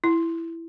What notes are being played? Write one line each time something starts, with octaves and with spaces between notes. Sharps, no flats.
E4